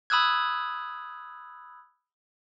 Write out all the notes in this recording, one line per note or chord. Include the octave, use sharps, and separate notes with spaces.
B5 D#6 E6 F#6 G#6